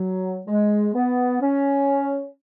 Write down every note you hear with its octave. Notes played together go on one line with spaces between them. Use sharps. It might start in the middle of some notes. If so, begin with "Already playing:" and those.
Already playing: F#3
G#3
B3
C#4